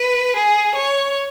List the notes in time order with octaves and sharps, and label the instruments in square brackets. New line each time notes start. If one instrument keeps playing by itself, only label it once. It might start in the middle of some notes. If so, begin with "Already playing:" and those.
Already playing: [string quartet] B4
G#4
C#5